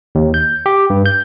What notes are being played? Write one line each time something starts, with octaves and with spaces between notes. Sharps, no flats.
D#2
G6
G4
G2
G6